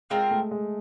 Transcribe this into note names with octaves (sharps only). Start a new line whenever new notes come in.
G#3 C4 F4 A#4
A3
G#3